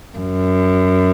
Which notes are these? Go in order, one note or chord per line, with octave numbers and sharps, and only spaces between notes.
F#2